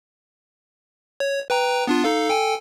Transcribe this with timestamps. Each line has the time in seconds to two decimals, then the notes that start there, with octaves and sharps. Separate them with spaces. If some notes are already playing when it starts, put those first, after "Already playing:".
1.20 C#5
1.50 B4 G5 A#5
1.87 B3 D4 F4
2.04 D#4 A4 F5
2.29 A4 G5 G#5